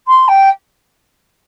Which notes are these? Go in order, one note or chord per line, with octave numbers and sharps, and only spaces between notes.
C6
G5